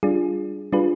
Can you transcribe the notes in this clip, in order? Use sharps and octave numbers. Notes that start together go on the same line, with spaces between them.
G3 D4 F4 G#4
G3 D4 F4 G#4 B4